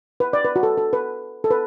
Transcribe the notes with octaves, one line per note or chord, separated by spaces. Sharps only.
B4
D5
B4
F#4
A4
A4
B4
A4
B4